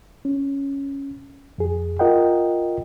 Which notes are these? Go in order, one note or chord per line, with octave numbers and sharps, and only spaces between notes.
C#4
F2 G#4
F4 A#4 D#5 F#5 G5